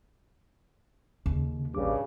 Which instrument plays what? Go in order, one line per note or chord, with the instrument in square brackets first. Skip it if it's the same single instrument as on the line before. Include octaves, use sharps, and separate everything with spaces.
[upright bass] D#2 [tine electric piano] C#3
[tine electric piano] A1 D6 [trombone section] G2 C#3